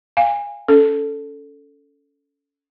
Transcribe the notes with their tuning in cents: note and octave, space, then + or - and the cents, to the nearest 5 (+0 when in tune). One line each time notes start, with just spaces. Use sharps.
F5 +0 G#5 -25
C#4 +25 A4 +0